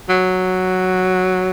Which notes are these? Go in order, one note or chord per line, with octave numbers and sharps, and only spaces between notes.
F#3